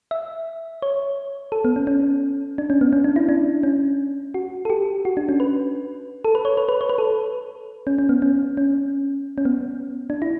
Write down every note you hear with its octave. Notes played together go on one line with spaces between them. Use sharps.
E5
C#5
A4
B3
C#4
C#4
D4
C#4
B3
C#4
D4
E4
D4
C#4
F#4
A4
G4
F#4
D4
C#4
B4
A4
B4
C#5
B4
B4
C#5
B4
A4
C#4
C#4
B3
C#4
C#4
C#4
B3
D4
E4